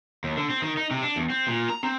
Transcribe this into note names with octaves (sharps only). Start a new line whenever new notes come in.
D#2
D3
C4
D#3
D#4
C3
D4
E2
C4
A#2
A#5
C4